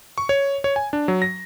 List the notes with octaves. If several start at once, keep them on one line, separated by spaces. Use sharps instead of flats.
C#6
C#5
C#5
G#5
D4
F#3
A#6